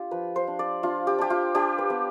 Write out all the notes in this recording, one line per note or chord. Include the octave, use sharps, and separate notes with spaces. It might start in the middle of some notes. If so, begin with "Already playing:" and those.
Already playing: D4 F4 G4
F3 B4
C5
D4
D5
D4 F4
G4
D4 G4
F4
D4 G4
B4
B3